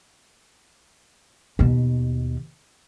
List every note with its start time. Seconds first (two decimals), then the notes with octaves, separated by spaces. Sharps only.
1.59 D#2 B2